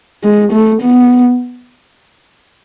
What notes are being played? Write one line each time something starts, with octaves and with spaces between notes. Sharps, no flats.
G#3
A3
B3